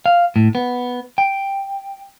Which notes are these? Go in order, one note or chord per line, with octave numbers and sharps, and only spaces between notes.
F5
A2
B3
G5